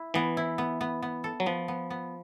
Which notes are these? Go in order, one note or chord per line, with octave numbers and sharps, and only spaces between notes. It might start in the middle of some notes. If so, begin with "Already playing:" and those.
Already playing: E4
E3 B3
E4
B3
B3
B3
A4
F#3
F3 B3
B3
B3